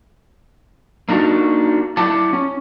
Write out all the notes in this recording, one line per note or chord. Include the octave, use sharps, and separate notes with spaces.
A#3 D4 D#4 F#4
E4 D5 F#5 A5
C#4